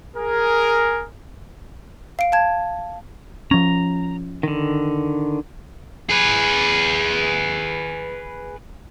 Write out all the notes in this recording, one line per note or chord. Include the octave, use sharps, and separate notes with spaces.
G#4 A#4
F5 D7
F5 A5 G#6
F3 C#4 A#5
D3 D#3
G#4 B4